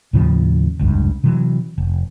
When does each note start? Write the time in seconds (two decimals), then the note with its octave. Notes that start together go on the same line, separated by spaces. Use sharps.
0.13 D#2 A2 C#3 F3
0.79 F1 C#2 G2
1.24 C3 E3 F#3
1.78 F1